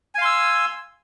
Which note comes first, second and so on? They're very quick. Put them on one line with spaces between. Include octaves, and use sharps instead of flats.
G#5 F5 C6 E6